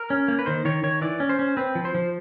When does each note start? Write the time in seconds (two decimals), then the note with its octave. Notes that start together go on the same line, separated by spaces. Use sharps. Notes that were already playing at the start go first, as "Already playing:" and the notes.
Already playing: A#4
0.10 C#4
0.28 A#3
0.39 B4
0.46 D#3 C5
0.65 D#3 C#5
0.83 D#3 C#5
1.01 E3 D5
1.20 C#4
1.29 C5
1.39 C#4
1.57 C4 B4
1.75 F3
1.85 C5
1.95 F3